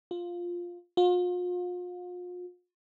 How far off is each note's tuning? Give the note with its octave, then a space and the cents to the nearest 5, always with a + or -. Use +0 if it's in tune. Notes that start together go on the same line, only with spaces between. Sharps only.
F4 +5
F4 +40